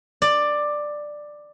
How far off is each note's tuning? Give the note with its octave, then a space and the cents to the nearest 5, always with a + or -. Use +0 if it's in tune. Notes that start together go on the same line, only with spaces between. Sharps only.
D5 +10